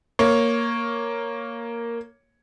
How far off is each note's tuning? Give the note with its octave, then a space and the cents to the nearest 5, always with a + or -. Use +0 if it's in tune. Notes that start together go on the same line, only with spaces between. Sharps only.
A#3 +0 C#5 +0